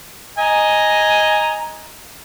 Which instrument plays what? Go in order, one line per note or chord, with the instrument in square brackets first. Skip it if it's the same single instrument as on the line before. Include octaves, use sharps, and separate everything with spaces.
[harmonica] D#5 G#5 A#5